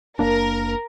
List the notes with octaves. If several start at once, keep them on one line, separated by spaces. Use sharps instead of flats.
F#1 A#3 D4 A#4